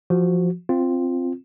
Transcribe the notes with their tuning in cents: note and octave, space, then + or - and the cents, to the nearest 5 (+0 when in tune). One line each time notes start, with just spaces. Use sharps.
F3 +0 F#4 +0
C4 +0 F4 +0